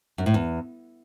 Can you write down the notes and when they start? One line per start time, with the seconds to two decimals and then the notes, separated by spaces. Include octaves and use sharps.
0.18 F#2
0.26 A2
0.34 E2